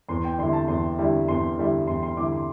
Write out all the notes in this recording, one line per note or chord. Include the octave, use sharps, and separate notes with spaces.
E2 C6
G5
D3 G3 E4 C6
A5
E2 C6
D3 G3 E4
E2 C6
D3 G3 E4
E2 C6
C6
D3 G3 E4 D6
C6